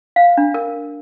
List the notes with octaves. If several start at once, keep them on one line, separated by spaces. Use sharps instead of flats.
F5
D4
A#4